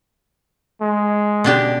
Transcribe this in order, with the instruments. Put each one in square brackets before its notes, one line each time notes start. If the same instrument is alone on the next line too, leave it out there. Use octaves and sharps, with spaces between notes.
[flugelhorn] G#3
[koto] B2 D4 G4